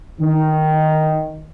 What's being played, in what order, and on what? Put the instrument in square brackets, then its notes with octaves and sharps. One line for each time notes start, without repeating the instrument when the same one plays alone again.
[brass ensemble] D#3